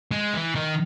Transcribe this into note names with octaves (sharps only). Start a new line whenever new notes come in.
G#3
E3
D#3